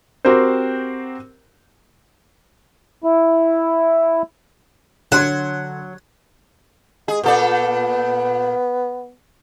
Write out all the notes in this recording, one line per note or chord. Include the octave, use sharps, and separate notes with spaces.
C4 F#4 G4 A#4 C5
E4
D3 F#3 F#5 C6 G#6
G#3 G#4
A#2 B3 A4 D5